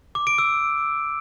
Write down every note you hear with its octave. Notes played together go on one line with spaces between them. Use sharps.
D6
D7
E6